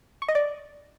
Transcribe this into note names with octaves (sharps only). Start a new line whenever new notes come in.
C#6
D#5
D5